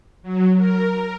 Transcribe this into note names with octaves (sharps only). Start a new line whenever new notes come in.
F#3
A#4